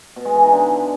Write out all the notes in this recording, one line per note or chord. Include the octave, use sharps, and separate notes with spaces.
B2
G#3
E3
D#4
D3